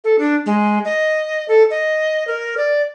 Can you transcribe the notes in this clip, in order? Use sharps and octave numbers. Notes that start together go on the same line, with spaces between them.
A4
D4
G#3
D#5
A4
D#5
A#4
D5